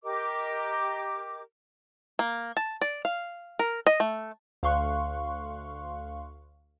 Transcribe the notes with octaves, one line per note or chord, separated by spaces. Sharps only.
G4 A#4 D#5 D6
A#3
A5
D5
F5
A#4
D#5
A3
D2 F5 C6 C#6 F#6